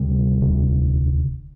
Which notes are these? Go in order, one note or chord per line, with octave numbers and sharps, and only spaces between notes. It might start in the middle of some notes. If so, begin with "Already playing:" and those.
Already playing: D2 C3 G3
E1 D2 C3